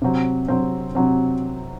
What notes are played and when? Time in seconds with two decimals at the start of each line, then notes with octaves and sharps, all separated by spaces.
0.02 C3 F#3 C4
0.48 C3 F#3 C4
0.95 C3 F#3 C4